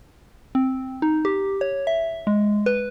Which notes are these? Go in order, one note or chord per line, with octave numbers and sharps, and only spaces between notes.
C4
D#4
G4
C#5
E5
G#3
B4